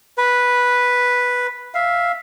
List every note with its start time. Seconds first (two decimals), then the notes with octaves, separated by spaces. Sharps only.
0.18 B4
1.74 E5 F5